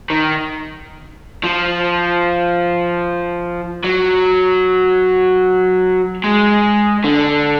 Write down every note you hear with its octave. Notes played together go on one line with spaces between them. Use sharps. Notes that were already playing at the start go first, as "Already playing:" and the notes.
D#3
F3
F#3
G#3
D3